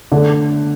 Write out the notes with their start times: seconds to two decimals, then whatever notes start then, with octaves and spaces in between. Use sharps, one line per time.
0.12 D3 A3 D4